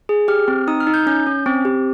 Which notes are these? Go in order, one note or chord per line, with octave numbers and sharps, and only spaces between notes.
G#4
G4 F6
C4
D#4 D#6
F6
D#4
G6
C#4 G6
C#4
C4
G4